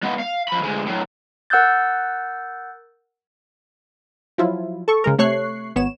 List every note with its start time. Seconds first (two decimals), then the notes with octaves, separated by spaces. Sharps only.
0.03 G#3 B3
0.19 F5
0.48 F3 B5
0.63 D2 G#3
0.87 A2 F#3
1.50 A#4 F#5 E6 F#6 G6 A6
4.38 F3 F#3 E4 F4
4.88 A4 C#6
5.04 C#3 G#3 A#4
5.18 C3 A3 C#5 C#6 F#6 C7
5.75 G#1 B3 C#5 E7